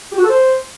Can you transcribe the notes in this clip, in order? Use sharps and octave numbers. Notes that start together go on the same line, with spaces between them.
G4
F#4
A4
C5